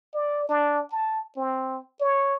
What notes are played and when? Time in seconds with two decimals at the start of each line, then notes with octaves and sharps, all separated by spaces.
0.15 D5
0.49 D4
0.92 A5
1.37 C4
2.01 C#5